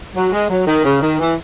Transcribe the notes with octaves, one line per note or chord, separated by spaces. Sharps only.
F#3
G#3
F#3
D#3
C#3
D#3
E3